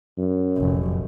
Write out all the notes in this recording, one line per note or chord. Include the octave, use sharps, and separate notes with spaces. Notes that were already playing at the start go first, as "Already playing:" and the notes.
F#2
F1 A#1